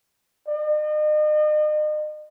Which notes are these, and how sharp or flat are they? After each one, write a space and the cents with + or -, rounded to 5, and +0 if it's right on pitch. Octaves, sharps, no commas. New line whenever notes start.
D#5 -40